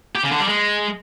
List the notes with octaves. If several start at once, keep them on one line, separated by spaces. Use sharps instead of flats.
G4
C#3
D3
G3
G#3